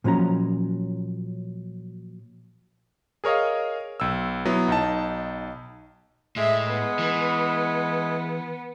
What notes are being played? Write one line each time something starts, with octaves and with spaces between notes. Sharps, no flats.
A#2 F3 F#3 C#4 A#5
G#4 A#4 C#5 D#5 F5
B1 E6
F#3 B3 E4
B1 D#4 A5
A2 G#3 E5
B3
E3